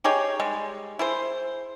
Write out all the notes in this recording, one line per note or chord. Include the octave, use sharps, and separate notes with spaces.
D#4 G4 G#4 C#5
G3 G#3
E4 G#4 C5